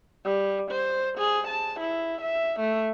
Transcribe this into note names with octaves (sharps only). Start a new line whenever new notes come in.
G3
C5
G#4
A5
E4
E5
A3